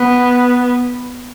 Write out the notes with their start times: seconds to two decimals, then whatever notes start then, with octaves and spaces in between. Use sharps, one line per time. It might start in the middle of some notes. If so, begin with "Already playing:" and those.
Already playing: B3